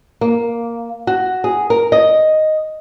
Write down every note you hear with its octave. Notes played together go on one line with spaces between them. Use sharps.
A#3
F#4
G#4
A#4
D#5